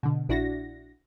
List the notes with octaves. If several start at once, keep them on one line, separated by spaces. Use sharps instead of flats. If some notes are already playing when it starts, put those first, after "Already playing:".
B2 D3
A#1 D4 E4 F#4 A#6